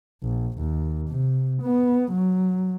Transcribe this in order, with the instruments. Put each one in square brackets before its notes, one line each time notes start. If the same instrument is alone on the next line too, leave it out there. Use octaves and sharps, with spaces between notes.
[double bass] A#1
D#2
C3
B3
F#3